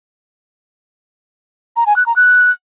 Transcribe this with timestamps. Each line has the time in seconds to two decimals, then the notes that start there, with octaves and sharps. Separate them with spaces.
1.76 A#5
1.86 G#5
1.96 F#6
2.06 A#5
2.16 F#6